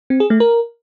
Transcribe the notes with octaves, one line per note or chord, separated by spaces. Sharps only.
C4
G#4
A3
A#4